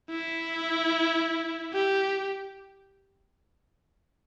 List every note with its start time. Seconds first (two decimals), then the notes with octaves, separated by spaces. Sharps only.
0.10 E4
1.74 G4